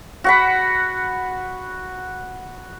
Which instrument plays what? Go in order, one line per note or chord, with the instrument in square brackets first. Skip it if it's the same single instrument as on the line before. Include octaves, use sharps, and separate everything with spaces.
[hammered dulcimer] F#4 F#5 B5